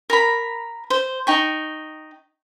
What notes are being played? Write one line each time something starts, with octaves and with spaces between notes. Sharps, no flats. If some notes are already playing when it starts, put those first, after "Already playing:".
A#4 A#5 B5
C5
D#4 G5 C#6